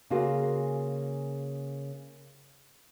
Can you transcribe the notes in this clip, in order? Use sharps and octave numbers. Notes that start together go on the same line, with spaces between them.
C#3 A#3 F4 F#4 G#4